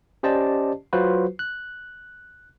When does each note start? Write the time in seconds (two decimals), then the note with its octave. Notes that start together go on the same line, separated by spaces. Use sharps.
0.23 C#4 G4 C5 D5 D#5 A5
0.93 F#3 F4 F#4 B4 C5
1.39 F#6